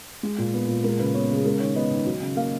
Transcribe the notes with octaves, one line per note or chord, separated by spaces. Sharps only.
G#3
A#2
B3
A#2
G#3 A#4
C#3 B4
B3 C#5
C#3 G#4
G#3 A#4
D#3 C#5
B3 D#5
D#3
F#3
C#3
A#3 F5